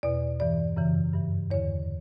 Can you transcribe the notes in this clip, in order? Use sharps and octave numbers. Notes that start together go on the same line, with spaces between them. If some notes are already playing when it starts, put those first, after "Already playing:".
E2 B2 D5
G2 E3 D5
F#2 C#3 E3
G2 E3
E2 D3 C#5